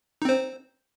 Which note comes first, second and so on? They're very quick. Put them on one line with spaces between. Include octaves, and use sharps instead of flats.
D#4 C4 C5